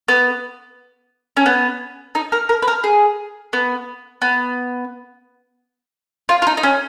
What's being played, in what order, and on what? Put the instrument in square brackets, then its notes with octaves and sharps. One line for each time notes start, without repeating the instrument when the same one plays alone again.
[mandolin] B3
C#4
B3
D#4
A#4
A#4
B4
A#4
G#4
B3
B3
F4
F4
D#4
D#4
C#4